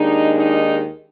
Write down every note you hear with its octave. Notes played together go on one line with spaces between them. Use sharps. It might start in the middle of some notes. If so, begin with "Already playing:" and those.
Already playing: D#2 D#3 G#3 D4 D#4
D#4